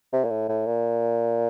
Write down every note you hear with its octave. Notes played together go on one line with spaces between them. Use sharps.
C3
A#2
A2
A2
A#2